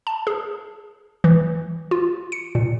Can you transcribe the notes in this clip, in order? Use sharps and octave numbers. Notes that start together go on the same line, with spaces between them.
A5
G#4
E3
F4
C#7
A#2